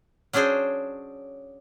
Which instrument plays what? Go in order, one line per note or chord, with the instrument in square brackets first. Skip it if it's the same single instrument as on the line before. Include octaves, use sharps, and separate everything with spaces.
[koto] F#3 C#4 D4 G#4 C5